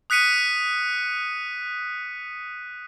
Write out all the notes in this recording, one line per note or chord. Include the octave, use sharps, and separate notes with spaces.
D#6 F#6 B6 C#7 D#7